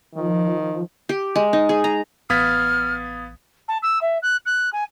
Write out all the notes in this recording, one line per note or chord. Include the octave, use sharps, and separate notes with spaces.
D#3 F3
G4
G#3
D#4
G#4
A#5
A1 B3 F5 D#6 F6 G#6 A6 B6
A5
E6
E5
F#6
F#6
G#5